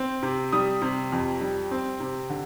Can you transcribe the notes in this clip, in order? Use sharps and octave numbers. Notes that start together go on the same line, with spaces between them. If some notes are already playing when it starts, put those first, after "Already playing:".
Already playing: C4
C3
G3 D#6
C3
F2
G3
C4
C3
D3